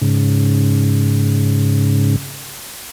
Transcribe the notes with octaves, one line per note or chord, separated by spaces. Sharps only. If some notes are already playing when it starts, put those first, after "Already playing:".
G#2 C#3